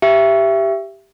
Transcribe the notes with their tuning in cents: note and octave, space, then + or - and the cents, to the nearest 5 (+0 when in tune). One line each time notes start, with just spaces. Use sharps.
G4 +0 E5 +20